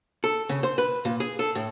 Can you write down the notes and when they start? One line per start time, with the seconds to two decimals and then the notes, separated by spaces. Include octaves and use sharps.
0.24 A4
0.49 C#3
0.63 C5
0.78 B4
1.05 A#2
1.20 G#4
1.39 A4
1.55 A2